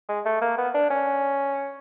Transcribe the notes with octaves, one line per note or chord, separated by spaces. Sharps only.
G#3
A3
A#3
B3
D4
C#4